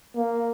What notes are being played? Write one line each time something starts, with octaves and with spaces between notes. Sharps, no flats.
A#3